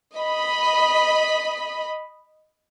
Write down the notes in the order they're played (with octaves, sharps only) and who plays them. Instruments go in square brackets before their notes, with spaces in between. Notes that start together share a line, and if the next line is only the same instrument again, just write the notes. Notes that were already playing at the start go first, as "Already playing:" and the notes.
[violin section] D#5 B5